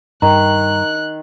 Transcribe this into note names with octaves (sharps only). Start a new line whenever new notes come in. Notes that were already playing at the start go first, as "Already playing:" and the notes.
G2 D#3 A#5 F#6